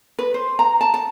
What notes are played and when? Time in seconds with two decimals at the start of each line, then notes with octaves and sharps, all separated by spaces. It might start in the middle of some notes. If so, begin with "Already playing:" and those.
0.19 B4
0.34 C5
0.59 A#5
0.81 A5
0.94 A5